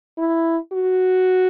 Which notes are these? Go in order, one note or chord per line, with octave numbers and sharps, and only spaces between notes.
E4
F#4